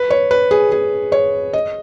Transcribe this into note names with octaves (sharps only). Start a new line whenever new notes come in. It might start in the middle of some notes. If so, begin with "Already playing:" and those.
Already playing: B4
C#5
B4
G#4
G#4
C#5
D#5